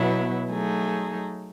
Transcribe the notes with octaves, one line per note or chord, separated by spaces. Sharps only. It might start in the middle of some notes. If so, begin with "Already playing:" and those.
Already playing: B2 F#3 B3 E4
F#3 A3 D#4 G#4